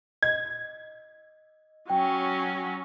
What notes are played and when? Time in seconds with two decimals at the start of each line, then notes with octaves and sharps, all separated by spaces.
0.23 D#5 G#6
1.90 F#3 C#4 G5